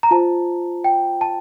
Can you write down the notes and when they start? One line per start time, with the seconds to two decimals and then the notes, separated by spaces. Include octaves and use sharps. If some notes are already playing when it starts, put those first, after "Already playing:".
0.03 A#5
0.11 F4 C5 A5
0.84 G5
1.21 A5